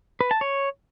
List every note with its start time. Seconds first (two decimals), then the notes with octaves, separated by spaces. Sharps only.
0.21 B4
0.31 A5
0.41 C#5